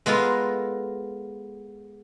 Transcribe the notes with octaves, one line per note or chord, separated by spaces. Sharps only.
G#3 B3 F4 A4 A#4